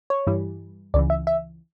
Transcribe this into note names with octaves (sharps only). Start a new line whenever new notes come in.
C#5
G2 E3 G3
C#2 C#3 E3 D5
E5
E5